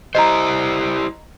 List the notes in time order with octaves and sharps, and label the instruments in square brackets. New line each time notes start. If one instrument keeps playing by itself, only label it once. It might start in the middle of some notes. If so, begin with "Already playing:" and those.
[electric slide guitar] E4 G4 C5 [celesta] D#5 A#5